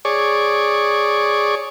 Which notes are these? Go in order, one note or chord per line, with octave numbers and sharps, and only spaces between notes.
G#4 C#5 D5